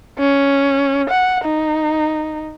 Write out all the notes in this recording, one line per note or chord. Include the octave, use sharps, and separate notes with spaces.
C#4
F#5
D#4